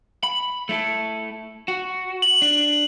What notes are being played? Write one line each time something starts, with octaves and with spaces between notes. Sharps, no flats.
B5
A3 E4 A4
F#4
F#7
D4